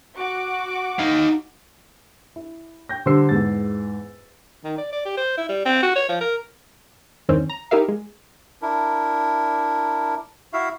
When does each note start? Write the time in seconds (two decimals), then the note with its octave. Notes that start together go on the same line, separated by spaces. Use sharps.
0.17 F#4 D6
0.99 D#4 F5
2.36 E4
2.89 G5 G6 A#6
3.06 D3 G3 C5 E6 C7
3.29 E2 G#2 A6
4.64 D#3
4.78 D5
4.93 D5
5.06 G4
5.17 C5
5.38 E4
5.49 G3
5.66 C4
5.83 F#4
5.96 C#5
6.09 F3
6.21 A#4
7.29 E2 G2 D#3 C4 C#4
7.49 A#5
7.71 D#4 E4 G4 A#4 E5 F5
7.88 G#3
8.62 D4 E4 A#4
10.53 E4 F#4 E5 F5